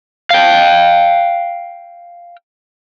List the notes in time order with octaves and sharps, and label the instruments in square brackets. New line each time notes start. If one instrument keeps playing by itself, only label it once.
[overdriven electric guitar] F5 G5